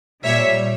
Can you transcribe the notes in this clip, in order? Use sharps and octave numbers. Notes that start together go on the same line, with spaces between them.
A#2 G3 C#5 E5